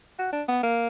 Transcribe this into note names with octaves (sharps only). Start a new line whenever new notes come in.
F#4
D4
B3
A#3